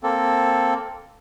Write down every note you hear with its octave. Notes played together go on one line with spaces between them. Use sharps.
A#3 C4 A4